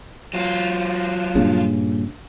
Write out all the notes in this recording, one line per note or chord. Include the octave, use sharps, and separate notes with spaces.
F#3 F4
G2 A#2 C#3